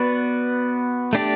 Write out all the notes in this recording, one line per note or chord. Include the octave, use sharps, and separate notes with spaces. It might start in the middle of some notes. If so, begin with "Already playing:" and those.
Already playing: B3 F#4 B4 D5
A3 D4 G4 D5